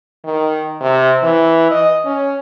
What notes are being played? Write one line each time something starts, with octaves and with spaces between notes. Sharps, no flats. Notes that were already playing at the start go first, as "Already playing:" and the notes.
D#3
C3
E3
D#5
C#4